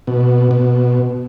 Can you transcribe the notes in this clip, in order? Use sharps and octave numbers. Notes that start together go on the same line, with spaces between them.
B2
B2